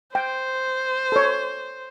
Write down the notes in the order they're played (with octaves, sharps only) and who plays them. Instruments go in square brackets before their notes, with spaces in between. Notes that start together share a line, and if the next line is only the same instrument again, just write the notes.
[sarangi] C5 [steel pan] G5
[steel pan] A4 C#5